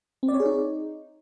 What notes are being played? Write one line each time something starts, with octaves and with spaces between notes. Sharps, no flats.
C4
D5
C#5
G#4
D#4